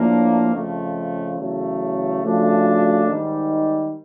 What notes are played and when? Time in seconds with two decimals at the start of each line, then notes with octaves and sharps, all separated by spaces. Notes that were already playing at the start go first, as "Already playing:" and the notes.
Already playing: A2 F3 A#3 D4
0.52 F2 C#3 F3 A3
1.37 E2 C#3 F#3 A3
2.22 C#3 F3 A3 D4 F#4
3.07 G#2 D#3 G3